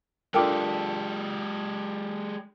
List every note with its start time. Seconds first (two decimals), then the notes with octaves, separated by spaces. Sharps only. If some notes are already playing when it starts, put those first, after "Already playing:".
0.34 G#3 D4 F4 G4 A4 A#4 G5 D6